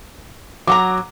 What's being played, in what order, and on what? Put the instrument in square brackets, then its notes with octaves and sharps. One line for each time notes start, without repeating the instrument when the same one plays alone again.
[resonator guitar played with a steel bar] F#3 F#5 A#5 [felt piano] D6